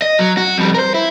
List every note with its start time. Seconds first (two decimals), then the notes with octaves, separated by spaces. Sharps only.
0.02 D#5
0.19 F#3
0.37 F#4
0.58 F2 G3
0.75 A#4 C5
0.94 E4